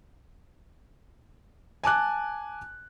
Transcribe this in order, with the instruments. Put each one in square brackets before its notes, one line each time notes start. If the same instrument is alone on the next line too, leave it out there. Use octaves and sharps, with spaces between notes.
[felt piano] G#5 A5 D6 F#6